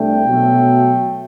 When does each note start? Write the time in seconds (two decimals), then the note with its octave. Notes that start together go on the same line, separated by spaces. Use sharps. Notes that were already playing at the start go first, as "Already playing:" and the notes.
Already playing: C2 A3 D4 G5
0.26 B2 F#3 A3